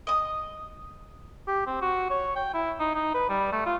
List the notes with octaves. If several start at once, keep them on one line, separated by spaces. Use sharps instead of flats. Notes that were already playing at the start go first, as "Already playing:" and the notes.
D#5 D#6
G4
C4
F#4
C#5
G5
E4
D#4
D#4
B4
G3
A3
F4